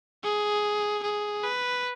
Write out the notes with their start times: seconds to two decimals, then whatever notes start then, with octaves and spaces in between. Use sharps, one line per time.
0.24 G#4
1.03 G#4
1.43 B4